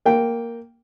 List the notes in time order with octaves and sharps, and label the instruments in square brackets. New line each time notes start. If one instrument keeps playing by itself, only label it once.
[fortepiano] A#3 G5